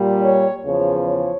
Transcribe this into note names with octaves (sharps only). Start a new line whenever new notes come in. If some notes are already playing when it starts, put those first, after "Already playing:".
Already playing: A#2 G3
C#5
E2 C#3 F3 C#5
C#5